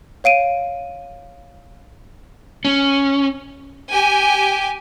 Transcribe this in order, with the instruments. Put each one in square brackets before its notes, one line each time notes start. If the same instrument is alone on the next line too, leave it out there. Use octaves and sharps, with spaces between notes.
[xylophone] C#5 F5 D7 D#7
[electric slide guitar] C#4
[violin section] G4 G#5